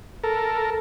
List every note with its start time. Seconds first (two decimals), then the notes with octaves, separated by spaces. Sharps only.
0.23 A4 A#4